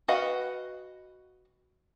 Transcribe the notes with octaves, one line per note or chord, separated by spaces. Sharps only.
F#4 B4 D#5 F5 F#5